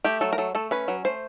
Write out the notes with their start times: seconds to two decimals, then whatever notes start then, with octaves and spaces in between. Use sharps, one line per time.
0.04 A3 G4
0.21 F#3 A4
0.33 A#4
0.38 F#3 A4
0.55 A3 A4
0.71 C#4 B4
0.88 F#3
1.05 A3 C5